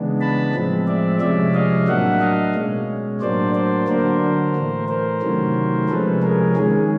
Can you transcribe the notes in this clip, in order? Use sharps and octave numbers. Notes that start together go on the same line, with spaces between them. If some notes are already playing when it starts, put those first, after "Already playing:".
Already playing: C#3 E3 G#3 B3 D4
A5 B5
A2 F3 G#3 C4
D5 E5
C3 F3 G#3 C#4 D5 E5
D#5 F5
A2 F#3 A#3 D4 E5 F#5
D#5 F5
B2 G#3 C#4
A2 F#3 A#3 D4 C5 D5
C5 D5
D3 F#3 A#3 D4 A#4 C5
A2 E3 A3
A#4 C5
C3 D#3 F#3 A3 C#4
C3 F3 G#3 C#4 A4 B4
G#4 A#4
D#3 G#3 C#4 G#4